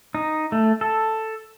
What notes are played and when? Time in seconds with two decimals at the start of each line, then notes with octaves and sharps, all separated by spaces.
0.15 D#4
0.52 A3
0.81 A4